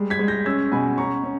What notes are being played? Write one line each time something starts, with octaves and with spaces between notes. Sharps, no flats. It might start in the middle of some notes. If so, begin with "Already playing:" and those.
Already playing: G3 G#3
G#6 B6
G#3
G6 A#6
C#4 E6 G#6
B2 G#5 B5
C#4 A#5 C#6
C#4